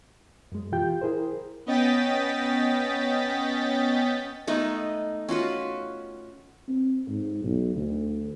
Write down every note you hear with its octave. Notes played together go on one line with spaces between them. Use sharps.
F#2 G#3
B2 E3 F4 G4 G5 G6
E4 G#4 A#4 C5
B3 C#4 D#5 G5 A6 B6
G#3 A3 B3 D#4
C#4 F4 F#4 B4
C4
G#2
B1
D2